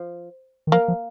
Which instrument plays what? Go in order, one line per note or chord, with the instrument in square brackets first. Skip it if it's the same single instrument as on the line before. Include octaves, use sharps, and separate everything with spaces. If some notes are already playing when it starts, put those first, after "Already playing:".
Already playing: [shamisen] F3
[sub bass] D#3
[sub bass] F3 [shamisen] A#3
[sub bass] F3